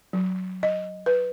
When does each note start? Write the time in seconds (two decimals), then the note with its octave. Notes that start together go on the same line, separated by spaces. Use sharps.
0.13 F#3
0.63 D#5
1.06 B4